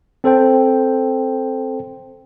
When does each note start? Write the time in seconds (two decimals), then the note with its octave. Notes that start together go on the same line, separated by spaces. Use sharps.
0.24 C4 A4 C5 G5